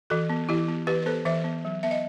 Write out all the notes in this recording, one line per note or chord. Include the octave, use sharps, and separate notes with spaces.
E3 F#4 A4
B3
E3 E4 G4
B3
E3 G4 B4
B4
B3 A4 C5
E3 C5 E5
B3
F#3
B3 E5
D#5